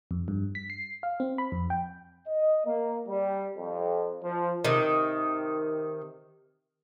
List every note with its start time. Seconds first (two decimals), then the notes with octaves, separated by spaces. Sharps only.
0.11 F2
0.28 G2
0.55 B6
0.70 C7
1.03 F5
1.20 C4
1.38 B5
1.52 F2
1.70 G5
2.28 D#5
2.66 A#3
3.08 G3
3.57 F2
4.23 F3
4.65 C3 D#3